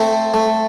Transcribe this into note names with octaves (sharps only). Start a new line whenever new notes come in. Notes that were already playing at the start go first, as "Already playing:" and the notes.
Already playing: A3 C4 C5
A3